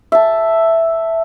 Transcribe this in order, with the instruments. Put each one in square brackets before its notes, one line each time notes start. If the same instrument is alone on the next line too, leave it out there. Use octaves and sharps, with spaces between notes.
[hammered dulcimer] E5 A5